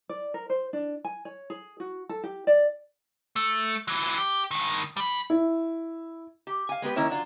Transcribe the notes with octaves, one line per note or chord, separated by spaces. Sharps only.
D5
A#4
C5
D4
G#5
C#5
G#4
F#4
A4
G4
D5
A3
E3 F#3
G4
G2 D#3
G3 B5
E4
G4
F5 G#5
G#3 B3 G4 B4
D#3 A#3 C#4 E4 C#5
F#3 D4 F4